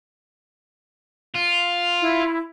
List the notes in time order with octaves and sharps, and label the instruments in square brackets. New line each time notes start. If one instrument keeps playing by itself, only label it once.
[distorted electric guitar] F4
[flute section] E4